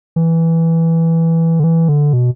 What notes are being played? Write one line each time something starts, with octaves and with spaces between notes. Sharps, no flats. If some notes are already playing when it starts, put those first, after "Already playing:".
E3
D3
E3
D3
B2